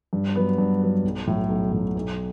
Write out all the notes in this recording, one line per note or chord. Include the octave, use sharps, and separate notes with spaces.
G2
F#3 B3
G2
F#3 B3
B1
A2 F#3
B1
A2 F#3
B1